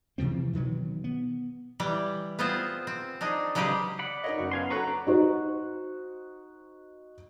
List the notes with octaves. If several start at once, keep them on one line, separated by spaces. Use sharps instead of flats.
C3 E3 F3 C4
B2 D#3 E3 F#3
B3
E3 G3 G5
B3 C4 F4 G#4 C5
C4
D4 D#4 G#4
C#3 F#3 G#3 G4 G#4 B4
D5 F#5 B5
D#4 A#4 C#5 D#5
F#1 F#4
B3 F5 G#5 C6
F#4 A4 B4 C#5 F#5 A#5
D4 D5
D#4 F#4 C5